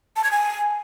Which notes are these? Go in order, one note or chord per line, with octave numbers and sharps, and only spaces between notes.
A5
G#6
G#5